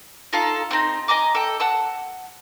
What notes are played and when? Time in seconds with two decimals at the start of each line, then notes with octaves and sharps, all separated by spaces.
0.33 D#4 F4 A4 F5
0.71 C4 D#4
1.08 D#5 G#5 A#5 D6
1.35 A4 G5
1.60 F#5 A5 E6